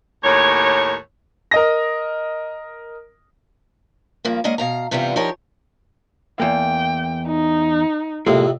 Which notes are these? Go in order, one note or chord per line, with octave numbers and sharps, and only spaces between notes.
D#2 A2 C#5
A#4 D#5 A#6
G2 F3 A#3
G#3 A#3 C#4 D4 D#5 F#5
B2 F5 A#5
G2 C3 E3 G3 B3 F4
F3 D#4 G4 A#4 C#5
E2 A#3 G5
D#4
F2 A2 C3 G#3 A#3